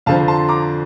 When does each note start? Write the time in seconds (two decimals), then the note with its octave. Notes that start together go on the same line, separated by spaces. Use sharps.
0.06 F2 D3 F3 F5 A5
0.28 A5 C6
0.48 A#5 D6